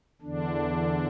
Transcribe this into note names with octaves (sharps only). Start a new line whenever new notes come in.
E2 D3 D4